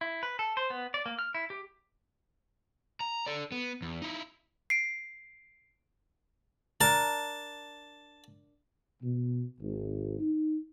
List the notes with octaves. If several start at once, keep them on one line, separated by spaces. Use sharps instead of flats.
E4
B4
A4
C5
B3
D5
A#3
F6
E4
G4
A#5
A4 D5
B3
E2
D#4 E4
C7 D7
D4 A#4 A5
B2
G#1
D#4